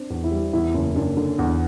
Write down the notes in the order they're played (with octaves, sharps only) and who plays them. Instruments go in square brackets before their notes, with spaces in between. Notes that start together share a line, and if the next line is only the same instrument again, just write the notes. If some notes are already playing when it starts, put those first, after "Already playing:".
Already playing: [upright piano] C4 D4
[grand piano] E2
[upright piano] E4
[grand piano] G3
[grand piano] E2 [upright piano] E4
[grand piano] F#1
[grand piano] F#1 [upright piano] D4
[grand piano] D3
[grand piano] E2 [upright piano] B3